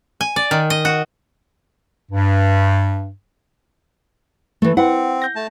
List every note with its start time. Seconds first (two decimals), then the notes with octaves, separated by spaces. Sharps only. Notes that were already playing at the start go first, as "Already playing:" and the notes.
0.21 G#5
0.36 D5
0.51 D#3
0.70 D#5
0.85 F#4
2.10 G2
4.62 E3 A3
4.77 C4 E4 B4 F#5
5.22 G6 A#6
5.36 A3 A5